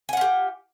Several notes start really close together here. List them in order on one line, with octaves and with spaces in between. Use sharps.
G#5 F#5 F4 G4